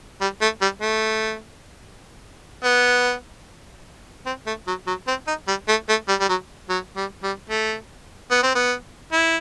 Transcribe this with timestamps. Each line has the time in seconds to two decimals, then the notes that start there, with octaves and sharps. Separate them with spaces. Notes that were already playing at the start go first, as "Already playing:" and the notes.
0.21 G3
0.42 A3
0.61 G3
0.82 A3
2.64 B3
4.26 C4
4.46 A3
4.67 F#3
4.87 F#3
5.07 C4
5.27 D#4
5.48 G3
5.68 A3
5.89 A3
6.09 G3
6.20 G3
6.29 F#3
6.69 F#3
6.96 G3
7.23 G3
7.50 A3
8.31 B3
8.43 C4
8.55 B3
9.12 E4